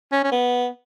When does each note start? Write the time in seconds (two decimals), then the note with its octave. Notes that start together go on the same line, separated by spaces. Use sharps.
0.12 C#4
0.24 C#4
0.32 B3